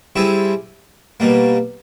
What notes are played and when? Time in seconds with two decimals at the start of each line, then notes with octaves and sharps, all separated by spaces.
0.16 G3 C4 E4 G#4
1.20 B2 G3 A#3